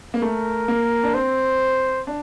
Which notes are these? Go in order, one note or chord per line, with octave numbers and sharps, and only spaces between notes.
A#3
A3 A#4
A#3
D4
C4 C5
D4